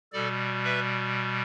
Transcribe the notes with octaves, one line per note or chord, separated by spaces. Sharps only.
B2 G3 A4 D5
B4 E5